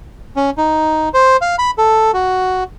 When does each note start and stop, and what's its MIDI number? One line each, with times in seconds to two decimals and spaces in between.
0.36 0.50 61
0.58 1.09 63
1.14 1.37 72
1.41 1.56 77
1.59 1.71 83
1.78 2.12 69
2.14 2.64 66